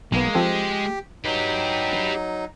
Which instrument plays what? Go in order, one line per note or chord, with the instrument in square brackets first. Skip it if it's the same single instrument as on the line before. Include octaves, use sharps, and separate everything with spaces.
[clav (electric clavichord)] B1 B3 [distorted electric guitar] G#3 [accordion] A#3
[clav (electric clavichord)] F3 C4 A4 [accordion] G4
[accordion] F#3 D#4 [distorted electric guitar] G4 B4